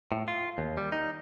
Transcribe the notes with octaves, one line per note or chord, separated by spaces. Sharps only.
A2
F4
D#2
G3
D#4